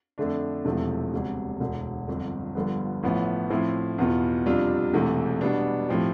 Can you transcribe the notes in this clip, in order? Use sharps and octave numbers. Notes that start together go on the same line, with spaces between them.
F2 D3 A3 D4
E1 E2 C3 F3 A3
E1 D2 C3 G3
E1 D2 D3
G1 F2 D3
G1 G2 D3 F3 B3
A1 A2 F3 B3 E4
A2 F3 C4 E4
E2 B2 B3 F4
F2 C3 G3 D4 F4
E1 E2 C3 E3 A3
B2 G3 B3 D4
A2 F3 C4 G4